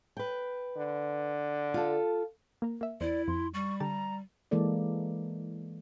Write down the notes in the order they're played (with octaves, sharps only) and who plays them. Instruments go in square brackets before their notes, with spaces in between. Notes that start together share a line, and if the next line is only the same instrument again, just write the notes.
[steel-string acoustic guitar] B4 G5
[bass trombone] D3
[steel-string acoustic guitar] F4 A4
[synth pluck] A#3 A#4
A#3 E5
[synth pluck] E2 C5 [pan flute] E4 [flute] D5
[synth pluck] F2 [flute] C6
[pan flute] G3 [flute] C#6
[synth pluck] D3 G4 A5 [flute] A#5
[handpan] E3 G#3 A#3 A4 D5